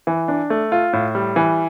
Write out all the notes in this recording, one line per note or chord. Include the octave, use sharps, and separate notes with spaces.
E3
D4
A3
F4
A2
G3
E3